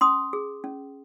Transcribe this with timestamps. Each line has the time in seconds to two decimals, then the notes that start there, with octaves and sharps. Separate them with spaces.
0.01 C#4 C6 D#6
0.33 G#4
0.64 C#4